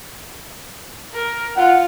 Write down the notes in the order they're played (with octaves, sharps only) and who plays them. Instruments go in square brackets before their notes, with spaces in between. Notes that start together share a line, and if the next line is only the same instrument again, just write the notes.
[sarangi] A#4
[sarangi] F4 [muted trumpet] F#5